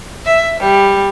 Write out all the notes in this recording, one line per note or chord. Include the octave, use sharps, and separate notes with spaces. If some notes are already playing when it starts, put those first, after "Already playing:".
E5
G3